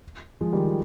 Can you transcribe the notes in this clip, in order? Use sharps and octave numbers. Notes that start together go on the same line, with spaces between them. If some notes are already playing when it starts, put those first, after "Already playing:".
F3 G#3
D#3 G3
F3